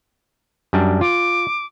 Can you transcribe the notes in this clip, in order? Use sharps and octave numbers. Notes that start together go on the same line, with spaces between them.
F#2 G3 D4
F4 D6